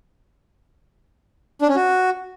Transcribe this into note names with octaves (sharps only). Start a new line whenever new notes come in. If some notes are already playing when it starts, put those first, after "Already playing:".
D4
C#4
F#4